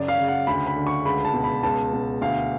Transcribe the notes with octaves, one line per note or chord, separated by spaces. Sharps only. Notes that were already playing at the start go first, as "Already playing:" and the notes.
Already playing: F#2 C#3 D5
F5
C#3
F#5
D2 B5
B5
D3
C#6
C#2 B5
A5
B2
B5
C#2 A5
B2
D2 F5